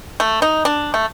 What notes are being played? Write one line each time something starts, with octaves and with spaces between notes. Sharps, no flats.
A3
D#4
D4
A3